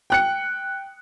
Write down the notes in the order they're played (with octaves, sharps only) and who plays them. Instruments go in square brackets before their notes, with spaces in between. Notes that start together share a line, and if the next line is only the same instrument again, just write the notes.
[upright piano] G5 F#6 C#7